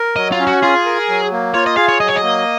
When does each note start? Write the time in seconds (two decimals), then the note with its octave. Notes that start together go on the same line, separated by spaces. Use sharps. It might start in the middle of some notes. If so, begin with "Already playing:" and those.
Already playing: A#4
0.16 F#3 D#5
0.32 F4
0.39 C#4
0.47 F#4
0.62 F4 G#4
0.86 A#4
1.09 F#3
1.32 A#3
1.54 F4 C#5
1.66 D#5
1.77 G#4 F5
1.89 C#5
2.00 F#3 D#5
2.08 C#5
2.16 D#5
2.23 A#3